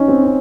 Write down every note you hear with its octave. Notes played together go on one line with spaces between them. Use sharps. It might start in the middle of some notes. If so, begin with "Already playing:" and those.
Already playing: C#4 D#4
C4
C#4